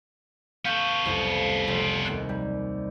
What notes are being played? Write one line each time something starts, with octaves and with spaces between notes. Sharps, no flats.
B3 A4 F5 C#6 G6
C2 F2
F1
D#2 F#6
G3